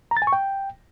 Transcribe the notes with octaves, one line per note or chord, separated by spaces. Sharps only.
A#5
A6
G#5
C#6
G5